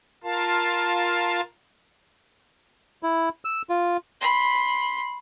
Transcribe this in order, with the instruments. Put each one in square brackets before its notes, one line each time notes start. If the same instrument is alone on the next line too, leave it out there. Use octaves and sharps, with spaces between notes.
[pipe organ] F4 A#4 F5 A5
[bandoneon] E4
E6
F4
[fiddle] B5 C6